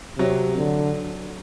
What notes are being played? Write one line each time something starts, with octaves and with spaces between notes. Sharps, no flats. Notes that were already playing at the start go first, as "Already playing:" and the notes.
C3 F#3
D3